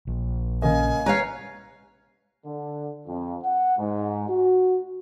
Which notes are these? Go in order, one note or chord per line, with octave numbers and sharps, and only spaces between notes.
A#1
C#3 A#3 D#5 G#5
B4 C#5 F5 A#5
D3
F2
F#5
G#2
F#4